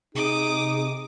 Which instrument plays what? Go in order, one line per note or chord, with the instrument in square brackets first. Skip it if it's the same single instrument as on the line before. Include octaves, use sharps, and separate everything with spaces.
[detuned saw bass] C3 [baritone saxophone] D#4 [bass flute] G#4 [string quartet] D6 D#6